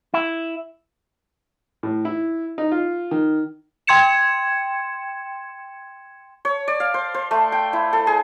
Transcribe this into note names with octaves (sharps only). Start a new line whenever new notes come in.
E4
A2
E4
D#4
F4
D#3
G5 C6 G#6 C#7 E7
C#5
D5
F5
C5
C5
A3
G5
E4
A4
G#4